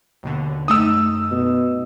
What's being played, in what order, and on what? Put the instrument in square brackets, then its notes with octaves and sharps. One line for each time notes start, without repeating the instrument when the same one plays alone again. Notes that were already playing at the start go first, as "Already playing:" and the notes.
[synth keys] D#2 B2 D3
[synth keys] F#2 A3 D#4 [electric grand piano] D#6 E6
[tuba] B2